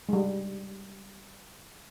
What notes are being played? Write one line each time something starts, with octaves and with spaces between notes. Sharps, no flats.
G3 G#3